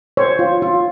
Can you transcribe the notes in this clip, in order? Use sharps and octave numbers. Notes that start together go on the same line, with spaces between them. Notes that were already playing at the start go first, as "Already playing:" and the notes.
C5 C#5
F4
F4